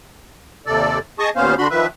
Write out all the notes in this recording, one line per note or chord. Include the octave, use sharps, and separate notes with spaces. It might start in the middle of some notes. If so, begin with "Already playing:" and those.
D#2 C3 A4 D5
G#4 D#5 A5 C#6 D#6
D#2 A#2 B3 C#4 C5 F5
D3 D4 F#4 B5 C6
D#3 F3 B4 E5